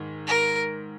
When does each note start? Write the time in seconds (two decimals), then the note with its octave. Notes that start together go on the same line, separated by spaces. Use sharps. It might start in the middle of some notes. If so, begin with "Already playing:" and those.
Already playing: G#2 D#3
0.28 A#4